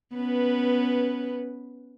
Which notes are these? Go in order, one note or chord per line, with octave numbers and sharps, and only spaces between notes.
B3 C#4 B4